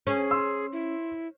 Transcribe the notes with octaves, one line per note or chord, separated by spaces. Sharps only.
C#4 G#4
C6 E6
E4